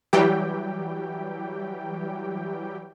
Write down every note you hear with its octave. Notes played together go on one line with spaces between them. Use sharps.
E3 F#3 G3 G4 G5